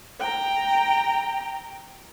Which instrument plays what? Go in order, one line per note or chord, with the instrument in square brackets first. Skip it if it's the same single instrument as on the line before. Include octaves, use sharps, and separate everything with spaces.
[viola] G5 A#5